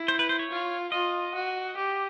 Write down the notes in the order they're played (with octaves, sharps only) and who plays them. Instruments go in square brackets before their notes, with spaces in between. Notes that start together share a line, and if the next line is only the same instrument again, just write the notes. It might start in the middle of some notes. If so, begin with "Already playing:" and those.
Already playing: [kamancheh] E4
[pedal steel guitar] C5
B4
C5
C#5
[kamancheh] F4
[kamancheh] F4 [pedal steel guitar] D#5
[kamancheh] F#4
G4